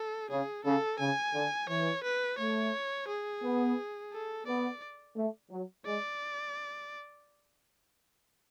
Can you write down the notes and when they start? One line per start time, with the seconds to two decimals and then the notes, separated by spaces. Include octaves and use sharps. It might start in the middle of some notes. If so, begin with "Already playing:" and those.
Already playing: A4
0.30 C#3 G#4
0.65 C#3 A4
0.99 C#3 G#5
1.34 D3
1.69 E3 C#5
2.04 B4
2.38 A3 C#5
3.08 G#4
3.43 B3
4.13 A4
4.47 B3 D5
5.17 A3
5.51 F#3
5.86 G#3 D5